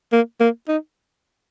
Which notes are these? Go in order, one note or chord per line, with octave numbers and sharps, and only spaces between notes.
A#3
A#3
D#4